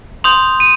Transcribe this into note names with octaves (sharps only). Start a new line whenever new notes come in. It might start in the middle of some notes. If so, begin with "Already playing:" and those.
C6 D#6 G6 F7
D#7